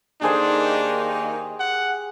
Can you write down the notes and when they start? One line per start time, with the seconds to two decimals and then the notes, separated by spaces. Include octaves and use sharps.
0.21 D#3 A#3 D4 D#4 G4 G#4 C5
1.60 F#5